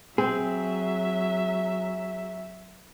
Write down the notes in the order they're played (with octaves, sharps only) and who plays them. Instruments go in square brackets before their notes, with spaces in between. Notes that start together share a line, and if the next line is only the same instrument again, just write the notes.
[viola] F#3 E5 [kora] C4 [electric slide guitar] G#4